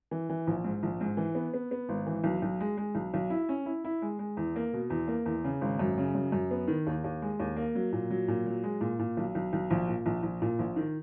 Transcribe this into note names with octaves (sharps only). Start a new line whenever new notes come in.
E3
E3
A#1
G#2
A#1
G#2
E3
B3
B3
B3
G#1
E3
B1
B1
G#3
G#3
B1
B1
E4
C#4
E4
E4
G#3
G#3
E2
A#3
B2
E2
A#3
E2
C#3
G#1
F#2
C#3
F#2
F#2
B3
D#3
D#2
D#2
G#3
D#2
A#3
F#3
A#2
F#3
A#2
F#3
G#3
A#2
A#2
B1
B1
B1
A#1
A#2
A#1
A#1
A#2
A#1
D#3